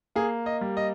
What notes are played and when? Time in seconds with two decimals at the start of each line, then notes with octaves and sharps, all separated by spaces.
0.16 A#3 G#4
0.46 D#5
0.61 G3
0.77 D#5